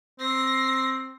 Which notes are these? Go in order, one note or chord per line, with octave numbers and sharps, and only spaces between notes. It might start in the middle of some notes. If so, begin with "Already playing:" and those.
C4 A#6 C7